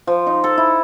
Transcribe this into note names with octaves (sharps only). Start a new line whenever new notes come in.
F3
D#4
A4
E4